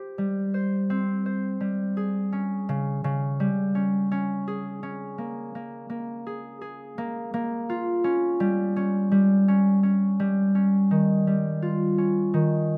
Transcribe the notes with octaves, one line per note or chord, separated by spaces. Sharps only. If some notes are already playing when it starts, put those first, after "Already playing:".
Already playing: G4 C5
G3
C5
C4
C5
G3
G#4
C#4
C#3
C#3
G3
C#4
C#4
G#4
C#4
A#3
A#3
A#3
G#4
G#4
A#3
A#3
F4
C#4
G3
C#4
G3
C#4
C#4
G3
C#4
D#3
G3
F4
C#4
D#3